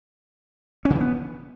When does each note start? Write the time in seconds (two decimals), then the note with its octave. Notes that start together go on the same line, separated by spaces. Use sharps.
0.85 C#4
0.90 C#3
0.95 E3
1.00 B3